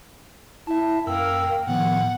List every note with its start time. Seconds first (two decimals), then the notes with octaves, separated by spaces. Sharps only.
0.67 E4 E5 A5
1.07 F#2 A#3 A#4 G5 E6
1.67 A2 D#3 F3 B3 F#5